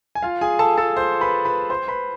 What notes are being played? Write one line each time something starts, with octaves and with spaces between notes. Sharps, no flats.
G#5
F4 F5
G#4 G#5
A4 A5
A4 A5
C5 C6
B4 B5
B4 B5
C5 C6
B4 B5